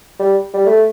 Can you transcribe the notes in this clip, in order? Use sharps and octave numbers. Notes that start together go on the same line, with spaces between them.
G3
G3
A3